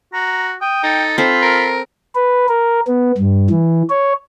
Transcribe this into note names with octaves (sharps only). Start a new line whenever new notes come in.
F#4 A#5
G5 D#6
D#4 A4
C4 F4 A4 B5
A#4
B4
A#4
B3
G2
E3
C#5